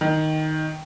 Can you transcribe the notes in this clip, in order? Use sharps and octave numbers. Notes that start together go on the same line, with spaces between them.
D#3